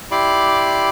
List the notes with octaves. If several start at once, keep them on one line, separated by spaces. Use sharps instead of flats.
E4 G4 D5 B5 C6 D6